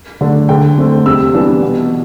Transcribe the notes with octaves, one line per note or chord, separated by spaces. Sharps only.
D3 A3 D4
D3 G5
A3 C4
C3 E6
E3 B3 D4
B2